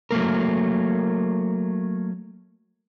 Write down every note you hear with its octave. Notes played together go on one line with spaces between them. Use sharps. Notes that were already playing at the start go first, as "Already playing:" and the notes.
F#3 A3 A#3 A#4